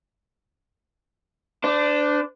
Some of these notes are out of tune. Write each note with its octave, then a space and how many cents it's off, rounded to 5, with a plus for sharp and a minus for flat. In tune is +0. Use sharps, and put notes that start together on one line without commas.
D4 +0 C5 -35